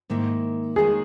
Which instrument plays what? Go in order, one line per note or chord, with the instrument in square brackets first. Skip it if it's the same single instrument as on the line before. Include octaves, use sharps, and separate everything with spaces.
[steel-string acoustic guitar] G#2 D#3 A#3 E4
[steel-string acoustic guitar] D#2 D#3 G#3 [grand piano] G#4